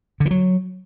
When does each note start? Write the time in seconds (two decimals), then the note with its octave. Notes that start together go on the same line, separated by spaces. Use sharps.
0.20 D3
0.26 E3
0.31 F#3